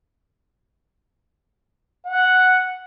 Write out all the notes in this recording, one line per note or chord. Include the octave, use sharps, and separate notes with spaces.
F#5